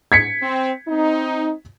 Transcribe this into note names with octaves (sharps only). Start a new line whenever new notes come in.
G#6 B6 C#7
C4
C4 D#4